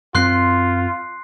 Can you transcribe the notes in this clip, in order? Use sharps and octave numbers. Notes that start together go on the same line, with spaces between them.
F#2 B3 C4 F4 C6 F#6 C7